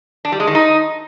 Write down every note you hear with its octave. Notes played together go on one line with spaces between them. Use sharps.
D4
G3
G#3
D#3
D#4